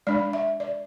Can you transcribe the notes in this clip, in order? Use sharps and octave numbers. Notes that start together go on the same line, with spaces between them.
G#3 D4 D5
E5
D5